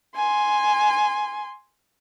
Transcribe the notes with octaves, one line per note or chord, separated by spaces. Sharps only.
G#5 C6